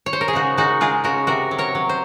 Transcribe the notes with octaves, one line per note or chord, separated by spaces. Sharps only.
C#5
C5
A#4
G#4
C#3 D#4 F#4
G#3 D#4 F#4
G#3 F4 G#4
C#3 F#4 A#4
C3 F#4 A#4
F#3
A#4 C#5
F#3
C5